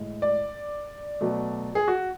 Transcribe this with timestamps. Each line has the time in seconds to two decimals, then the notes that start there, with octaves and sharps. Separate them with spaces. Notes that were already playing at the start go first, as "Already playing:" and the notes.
Already playing: A2 G#3
0.22 D5
1.21 B2 F#3 A3
1.75 G#4
1.88 F#4